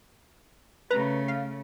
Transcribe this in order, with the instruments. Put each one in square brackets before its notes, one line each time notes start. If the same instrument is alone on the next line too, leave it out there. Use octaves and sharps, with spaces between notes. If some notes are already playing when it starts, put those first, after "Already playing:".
[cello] C#3 A3 [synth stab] B4 A#5
[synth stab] F5